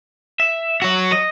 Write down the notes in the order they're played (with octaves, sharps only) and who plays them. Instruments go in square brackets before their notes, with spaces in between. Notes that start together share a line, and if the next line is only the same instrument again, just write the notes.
[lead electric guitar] E5
[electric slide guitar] F#3 F#4
[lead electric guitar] D#5